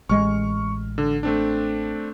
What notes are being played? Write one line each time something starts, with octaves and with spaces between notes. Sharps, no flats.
A1 G#3 C#6 F6
D3
A3 C4 D4